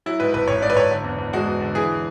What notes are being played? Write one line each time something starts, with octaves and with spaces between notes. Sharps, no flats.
F#3 E4
G#2 B4
G#1 B4
G#1 C#5
G#2 D5
B4
G#1 C#5
D3
E2
E2
G#3 F#4
E2
D3
E3 G#4
E3